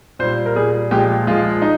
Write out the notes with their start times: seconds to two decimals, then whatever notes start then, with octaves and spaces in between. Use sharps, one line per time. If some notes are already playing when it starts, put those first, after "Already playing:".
0.19 A#2 G3 C5
0.46 A#4
0.56 A#2 G3 G#4
0.91 A#2 F3 G#3 G4
1.27 A#2 F3 G#3 F4
1.62 D#4